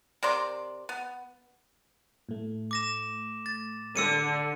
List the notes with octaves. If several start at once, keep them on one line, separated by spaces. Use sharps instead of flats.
C3 A#4 D5 C6
B3
A2 A3
D6 A#6 E7
A6
D3 E6 C#7 D#7